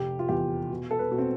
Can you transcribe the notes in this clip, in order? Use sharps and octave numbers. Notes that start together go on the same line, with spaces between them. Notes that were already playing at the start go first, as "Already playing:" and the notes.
Already playing: F1 G4
F4
E2 G4
B2
A4
B4
B2
C4